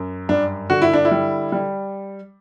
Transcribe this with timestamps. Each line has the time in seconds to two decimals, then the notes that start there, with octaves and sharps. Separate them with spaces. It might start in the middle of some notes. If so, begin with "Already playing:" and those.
Already playing: F#2
0.29 G2 D4
0.70 D3 F#4
0.82 E4
0.93 D4
1.05 E4
1.11 G3
1.52 G3